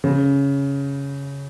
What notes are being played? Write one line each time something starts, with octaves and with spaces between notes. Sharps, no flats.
C#3